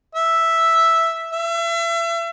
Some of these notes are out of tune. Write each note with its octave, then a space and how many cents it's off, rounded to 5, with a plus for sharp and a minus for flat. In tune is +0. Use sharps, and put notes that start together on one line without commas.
E5 +0
E5 +35